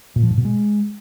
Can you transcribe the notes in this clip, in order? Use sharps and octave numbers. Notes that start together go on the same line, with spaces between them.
A#2
F3
G#2
B2
G#3